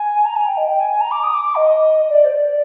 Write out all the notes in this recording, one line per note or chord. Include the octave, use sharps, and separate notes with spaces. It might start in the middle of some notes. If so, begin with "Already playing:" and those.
Already playing: G#5
A#5
G#5
G5
D#5
G5
G#5
G#5
A#5
D6
D#6
D6
D6
D#5
D5
C5
D5